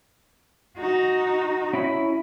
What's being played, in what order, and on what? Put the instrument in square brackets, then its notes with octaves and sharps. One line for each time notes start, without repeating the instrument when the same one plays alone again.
[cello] D#4 F#4
[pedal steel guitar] C#4 E4 B5